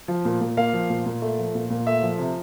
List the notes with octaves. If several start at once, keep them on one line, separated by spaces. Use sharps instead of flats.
F3
A#2
A#2
A#3 F5
F3
A#2
A#2
A3
F3
A#2
A#2
A3 E5
F3
C3